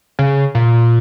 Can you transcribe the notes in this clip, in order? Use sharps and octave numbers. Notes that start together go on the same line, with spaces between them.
C#3
A#2